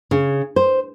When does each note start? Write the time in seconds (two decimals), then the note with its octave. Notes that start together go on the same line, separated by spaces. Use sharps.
0.11 C#3
0.56 C5